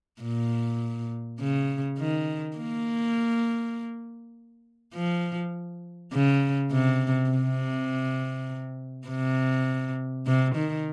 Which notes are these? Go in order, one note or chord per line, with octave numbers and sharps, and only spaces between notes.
A#2
C#3
D#3
A#3
F3
C#3
C3
C3
C3
C3
D#3